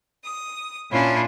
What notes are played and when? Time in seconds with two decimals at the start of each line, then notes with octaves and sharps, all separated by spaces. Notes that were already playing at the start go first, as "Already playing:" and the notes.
0.23 D#6
0.91 A#2 C#4 D4 E4 F4